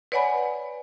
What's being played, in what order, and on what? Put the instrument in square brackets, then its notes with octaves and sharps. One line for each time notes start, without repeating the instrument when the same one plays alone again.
[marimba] B4 C#5 D5 F#5 G#5 B5